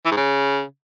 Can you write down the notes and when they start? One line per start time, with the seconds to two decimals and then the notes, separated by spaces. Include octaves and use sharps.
0.06 E3
0.11 G#2
0.17 C#3